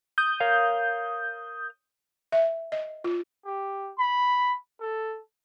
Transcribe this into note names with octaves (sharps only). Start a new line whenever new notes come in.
D#6 G6
A#4 C#5 F5
E5
D#5
F4
G4
B5
A4